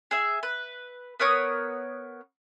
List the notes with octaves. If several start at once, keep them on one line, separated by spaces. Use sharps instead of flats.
G#4 E5
B4
B3 A#4 C#5 D#6